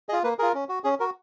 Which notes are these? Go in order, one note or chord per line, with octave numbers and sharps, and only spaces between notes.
F4 G#4 D#5
A#3 B4
F4 G#4 A#4
C#4
F#4
C#4 G#4
F#4 A#4